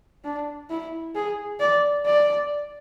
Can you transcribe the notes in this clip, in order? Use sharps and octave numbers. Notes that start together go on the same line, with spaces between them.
D4
E4
G#4
D5
D5